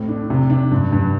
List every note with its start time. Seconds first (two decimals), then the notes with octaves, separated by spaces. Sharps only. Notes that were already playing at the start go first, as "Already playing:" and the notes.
Already playing: A2 C4
0.08 D4
0.30 C3
0.50 D4
0.71 G2
0.93 G2